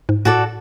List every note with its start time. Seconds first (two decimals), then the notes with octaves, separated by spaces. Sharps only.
0.09 G#2
0.25 A2 F#4 A4 D5